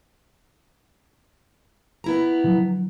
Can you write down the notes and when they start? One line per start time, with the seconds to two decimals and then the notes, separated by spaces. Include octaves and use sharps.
2.04 B3 E4 A#5
2.44 D3 F3 F#3